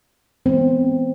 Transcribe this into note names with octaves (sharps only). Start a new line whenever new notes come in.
E3 G#3 B3 C4